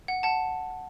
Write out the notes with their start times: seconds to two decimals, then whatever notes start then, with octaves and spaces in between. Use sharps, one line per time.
0.08 F#5
0.23 F#5 A5